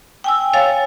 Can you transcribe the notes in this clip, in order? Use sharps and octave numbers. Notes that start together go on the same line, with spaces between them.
G5 G#5 E6
C#5 F5 G#5 A6